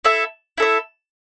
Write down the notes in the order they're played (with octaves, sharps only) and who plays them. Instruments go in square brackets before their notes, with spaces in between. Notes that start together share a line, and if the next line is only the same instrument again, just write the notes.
[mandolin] E4 A4 E5
E4 A4 E5